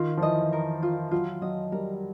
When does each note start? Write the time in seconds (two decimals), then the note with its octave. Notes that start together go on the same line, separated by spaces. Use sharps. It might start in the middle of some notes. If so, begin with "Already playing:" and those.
Already playing: D#3 F4
0.17 F3
0.22 E3 D#5
0.53 A#4
0.83 F4
1.11 F#3 F4
1.42 F#3 D#5
1.72 G3 A#4